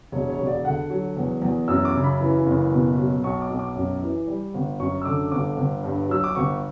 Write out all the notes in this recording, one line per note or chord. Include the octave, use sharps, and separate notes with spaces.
E1 C#5
C#5
E1
D5
D3 F#5
F#3
E2
E2
F#2 E6
D6
C#3
B5
E3
F#1
B2
F#3
B1 C#6
D6
B1
D6
F#2
E3
G3
G1
F#2 C#6
E6
D3 D6
G1 D6
G1
G2
F#3 E6
D6
G1 C#6